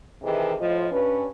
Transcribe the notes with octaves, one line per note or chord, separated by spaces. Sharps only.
C3 D#3 E3 G#4 A4 D#5
A2 F3 F4 C5 D#5
G2 C#4 B4